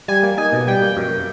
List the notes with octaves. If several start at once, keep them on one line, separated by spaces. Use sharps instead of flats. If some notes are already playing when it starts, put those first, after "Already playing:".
G3 G#5
A#3
D#4 G#5
B2
G3 G5
A#3
F#2